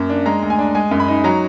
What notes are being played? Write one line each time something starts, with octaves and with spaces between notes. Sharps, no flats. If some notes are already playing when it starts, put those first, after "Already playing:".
Already playing: F#2 A#3
D4
G#3 A#5
D2
G#5
D4
G#3 G#5
F#2
B5
D#4
F#3 A#5